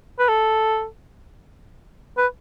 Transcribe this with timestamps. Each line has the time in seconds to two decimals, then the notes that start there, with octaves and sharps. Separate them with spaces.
0.19 B4
0.29 A4
2.17 B4